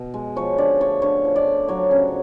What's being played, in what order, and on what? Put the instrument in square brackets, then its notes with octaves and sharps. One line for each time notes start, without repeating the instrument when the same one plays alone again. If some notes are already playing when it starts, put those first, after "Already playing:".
Already playing: [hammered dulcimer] B2
G#3
F3 C#5
D3 D5
A3 C#5
D3 C#5
F3
D5
D3
F#3 C#5
C#3